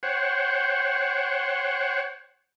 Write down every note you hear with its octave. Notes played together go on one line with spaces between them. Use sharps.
C5 C#5 F#5 G5